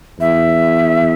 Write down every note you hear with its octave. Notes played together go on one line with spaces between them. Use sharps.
E2 E5